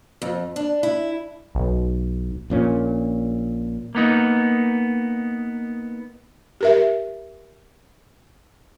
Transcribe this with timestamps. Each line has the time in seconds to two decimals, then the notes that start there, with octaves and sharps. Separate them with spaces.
0.22 F2
0.56 D4
0.83 E4
1.55 B1
2.50 A#1 A#2 C#4
3.95 A#3 B3 D#4
6.61 G4 A#4 E5